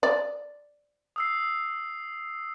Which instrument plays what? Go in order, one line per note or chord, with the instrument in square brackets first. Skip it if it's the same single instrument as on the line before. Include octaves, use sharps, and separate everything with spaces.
[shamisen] D5
[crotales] D#6 E6 C7